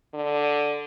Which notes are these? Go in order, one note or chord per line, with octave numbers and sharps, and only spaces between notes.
D3